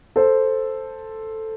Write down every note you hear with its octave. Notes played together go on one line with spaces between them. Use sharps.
A4 C5